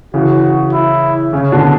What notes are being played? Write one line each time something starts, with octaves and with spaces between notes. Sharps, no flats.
C#3 E3 F#4
E4
C#3 C#4
B2 D3